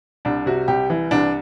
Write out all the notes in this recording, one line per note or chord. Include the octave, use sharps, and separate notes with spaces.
C2 D4
C3 F#4
C2 G4
E3
C2 D4